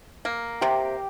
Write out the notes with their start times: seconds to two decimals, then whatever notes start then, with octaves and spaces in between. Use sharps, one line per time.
0.25 A#3
0.61 C3 G4